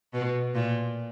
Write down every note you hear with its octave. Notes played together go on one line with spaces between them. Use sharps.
B2
A#2